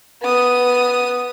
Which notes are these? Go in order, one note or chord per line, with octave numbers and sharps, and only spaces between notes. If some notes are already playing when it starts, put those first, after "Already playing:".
B3 D#6